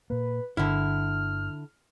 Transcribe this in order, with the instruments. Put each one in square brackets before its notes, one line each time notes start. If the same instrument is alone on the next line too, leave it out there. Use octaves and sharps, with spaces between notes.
[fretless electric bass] A#2 A#3 [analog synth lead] B4
[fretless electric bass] G1 [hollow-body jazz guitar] D3 E4 [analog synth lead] F6